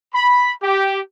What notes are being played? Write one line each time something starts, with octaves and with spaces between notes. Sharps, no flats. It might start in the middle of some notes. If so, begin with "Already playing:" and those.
B5
G4